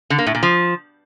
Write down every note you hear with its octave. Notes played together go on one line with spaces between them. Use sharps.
D3
A#3
A2
A#2
F3